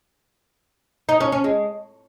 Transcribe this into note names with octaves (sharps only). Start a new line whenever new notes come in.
D#4
C#4
C#4
G#3